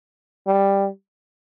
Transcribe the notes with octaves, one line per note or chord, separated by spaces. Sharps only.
G3